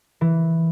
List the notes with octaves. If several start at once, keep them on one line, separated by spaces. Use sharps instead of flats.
E3